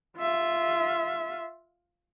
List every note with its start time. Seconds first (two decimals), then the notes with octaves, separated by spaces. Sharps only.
0.18 F4 E5